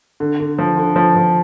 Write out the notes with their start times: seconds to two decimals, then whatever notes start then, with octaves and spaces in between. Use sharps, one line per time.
0.20 D3
0.40 D3
0.59 F3
0.77 D3
0.96 F3
1.16 F3